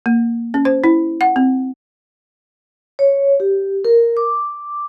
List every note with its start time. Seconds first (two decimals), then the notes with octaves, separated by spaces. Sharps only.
0.06 A#3
0.54 C#4
0.65 C5
0.84 E4
1.21 F#5
1.36 C4
2.99 C#5
3.40 G4
3.85 A#4
4.17 D6